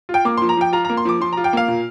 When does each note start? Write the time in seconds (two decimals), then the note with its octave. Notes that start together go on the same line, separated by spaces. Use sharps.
0.09 F4
0.14 G5
0.25 A#3 D6
0.37 C6
0.42 F3
0.49 A#5
0.57 F3 G5
0.73 F4 A#5
0.85 A#5
0.90 A#3
0.97 C6
1.05 F3 D6
1.21 F3 C6
1.33 A#5
1.37 F4
1.44 G5
1.53 A#3 F5
1.68 A#2